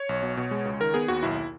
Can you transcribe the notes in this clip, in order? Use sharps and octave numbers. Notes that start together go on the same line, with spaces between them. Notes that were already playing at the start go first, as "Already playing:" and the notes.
Already playing: C#5
B1
B2
B2
G#3
C#2
D#3 A#4
B3 G#4
D#2 F#4
B1 E4